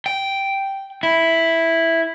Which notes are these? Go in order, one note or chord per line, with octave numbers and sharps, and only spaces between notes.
G5
E4